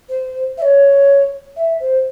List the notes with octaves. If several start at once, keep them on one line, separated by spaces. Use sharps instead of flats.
C5
E5
C#5
E5
C5